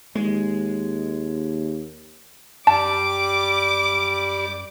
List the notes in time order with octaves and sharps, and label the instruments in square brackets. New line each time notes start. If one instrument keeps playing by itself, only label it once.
[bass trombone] D#2 [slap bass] G#3
[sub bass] F#2 [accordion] G3 [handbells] A5 [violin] D6